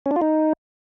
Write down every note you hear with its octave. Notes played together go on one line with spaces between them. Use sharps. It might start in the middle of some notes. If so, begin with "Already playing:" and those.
C#4
D4
F4
D#4